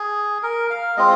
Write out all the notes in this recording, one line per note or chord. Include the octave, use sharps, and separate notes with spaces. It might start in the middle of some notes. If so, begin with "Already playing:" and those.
Already playing: G#4
A#4
F5
G#3 C4 F4 D#5